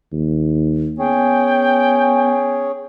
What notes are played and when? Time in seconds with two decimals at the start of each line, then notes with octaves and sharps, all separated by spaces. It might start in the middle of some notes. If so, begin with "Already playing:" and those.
0.12 D#2
0.99 B3 C#4 G#4 C#5 G5